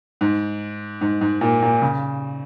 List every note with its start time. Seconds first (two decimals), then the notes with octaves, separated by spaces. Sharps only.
0.21 G#2
1.01 G#2
1.21 G#2
1.41 A#2
1.62 A#2
1.82 C#3